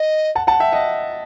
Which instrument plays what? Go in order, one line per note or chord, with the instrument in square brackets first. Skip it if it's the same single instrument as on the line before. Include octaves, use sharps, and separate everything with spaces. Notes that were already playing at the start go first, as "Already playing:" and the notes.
Already playing: [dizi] D#5
[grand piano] F#5 A5
F#5 A5
E5 G5
D#5 F#5